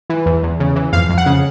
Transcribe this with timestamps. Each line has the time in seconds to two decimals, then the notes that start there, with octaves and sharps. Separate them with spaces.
0.10 E3
0.26 E2
0.43 E2
0.60 C#3
0.76 E3
0.93 F2 F5
1.09 F2
1.18 F#5
1.26 C#3